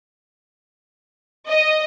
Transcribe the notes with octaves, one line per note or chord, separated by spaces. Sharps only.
D#5